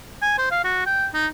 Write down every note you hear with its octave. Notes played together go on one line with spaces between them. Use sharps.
G#5
C5
F5
F#4
G5
D#4